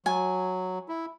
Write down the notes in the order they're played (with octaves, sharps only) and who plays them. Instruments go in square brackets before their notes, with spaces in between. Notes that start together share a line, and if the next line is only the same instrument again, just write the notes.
[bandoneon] F#3 [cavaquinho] G#5
[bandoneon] E4